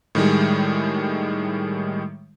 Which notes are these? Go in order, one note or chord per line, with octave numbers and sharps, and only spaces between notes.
A2 D#3 G3 G#3